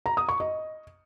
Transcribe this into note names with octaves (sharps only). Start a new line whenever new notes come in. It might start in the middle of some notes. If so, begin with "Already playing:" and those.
A#5
D#6
C#6
D#5